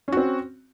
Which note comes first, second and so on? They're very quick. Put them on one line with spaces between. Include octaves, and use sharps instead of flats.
C#4 F#4 C4